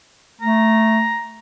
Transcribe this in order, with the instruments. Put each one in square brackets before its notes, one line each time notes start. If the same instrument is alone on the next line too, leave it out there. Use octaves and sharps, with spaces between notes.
[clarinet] A3 [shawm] A#5